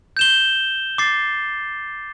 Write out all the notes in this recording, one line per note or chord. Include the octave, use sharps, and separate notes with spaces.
G6 E7 G7
D6 A6 C7